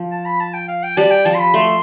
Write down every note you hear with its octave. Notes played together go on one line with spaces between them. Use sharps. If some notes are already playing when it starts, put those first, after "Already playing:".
Already playing: F3
A5
B5
A5
G5
F5
G5
G3 A5
G5
F3 A5
C6
B5
A3 C6